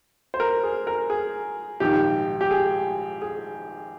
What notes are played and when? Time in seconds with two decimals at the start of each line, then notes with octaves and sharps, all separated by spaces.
0.34 C5
0.40 A#4
0.63 G#4
0.87 A#4
1.10 G#4
1.80 A#1 G#2 D#3 G4
2.41 G4
2.51 G#4
3.22 G#4